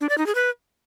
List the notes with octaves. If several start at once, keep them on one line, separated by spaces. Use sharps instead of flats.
D4
D5
D#4
G#4
B4